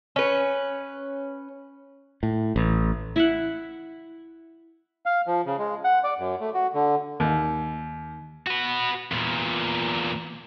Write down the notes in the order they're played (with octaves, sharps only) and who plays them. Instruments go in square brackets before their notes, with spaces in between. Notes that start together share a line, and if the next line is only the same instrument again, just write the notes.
[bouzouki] C#4 B4
[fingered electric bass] A2
A1
[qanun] E4 E5 F#5
[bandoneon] F5
F3
C#3
G#3
F#5
D5
F#2
A3
F#4
D3
[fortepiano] D#2 [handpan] D#3
[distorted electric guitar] F#4 B4
E2 A#2